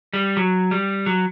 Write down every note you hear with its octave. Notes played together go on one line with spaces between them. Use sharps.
G3
F#3
G3
F#3